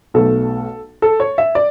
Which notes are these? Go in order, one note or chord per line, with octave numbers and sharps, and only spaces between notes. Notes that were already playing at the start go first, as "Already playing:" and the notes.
B1 B2 A3 A4
A4
C#5
E5
D5